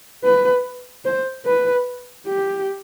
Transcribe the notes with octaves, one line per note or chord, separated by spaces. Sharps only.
B4
C5
B4
G4